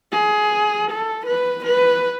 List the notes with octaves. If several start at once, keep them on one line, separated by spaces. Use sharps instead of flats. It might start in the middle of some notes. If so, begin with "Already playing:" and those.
G#4
A4
B4
B4